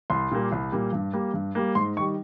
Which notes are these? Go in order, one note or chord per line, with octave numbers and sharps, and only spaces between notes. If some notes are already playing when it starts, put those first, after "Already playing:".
C2 C6
A#2 G3 A#3
C2
A#2 G3 A#3
G2
G3 A#3
G2
G3 A#3
G#2 C6
D#3 G3 C#6